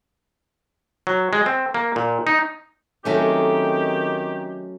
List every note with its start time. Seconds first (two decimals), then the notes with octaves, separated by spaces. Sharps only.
1.07 F#3
1.33 G#3
1.46 C4
1.74 A#3
1.96 A#2
2.27 D#4
3.05 D#3 F#3 A3 C4 C#4 G4